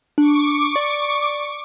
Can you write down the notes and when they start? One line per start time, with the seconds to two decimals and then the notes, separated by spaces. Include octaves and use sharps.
0.18 D4 C#6 D6
0.76 D5